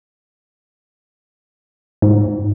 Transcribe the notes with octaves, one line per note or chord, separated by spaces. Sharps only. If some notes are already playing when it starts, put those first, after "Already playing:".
G#2